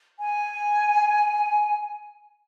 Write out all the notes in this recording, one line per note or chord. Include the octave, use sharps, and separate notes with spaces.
G#5